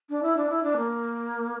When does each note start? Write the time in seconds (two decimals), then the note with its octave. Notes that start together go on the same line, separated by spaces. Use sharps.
0.10 D4
0.23 E4
0.37 D4
0.50 E4
0.63 D4
0.77 A#3